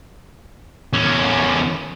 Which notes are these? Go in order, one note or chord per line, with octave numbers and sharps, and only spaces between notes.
E2 C#4